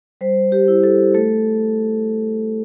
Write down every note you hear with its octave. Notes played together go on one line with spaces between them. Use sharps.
G3 C5
G4
E4
A4
A3 A4